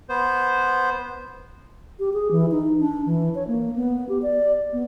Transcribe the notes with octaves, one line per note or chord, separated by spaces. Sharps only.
B3 C5
G4
G#4
E3
D#4
D4
E3
C#5
A#3
B3
G4
D5
B3